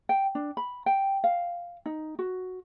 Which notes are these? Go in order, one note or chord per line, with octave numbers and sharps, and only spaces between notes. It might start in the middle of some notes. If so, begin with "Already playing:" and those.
G5
D4
B5
G5
F5
D#4
F#4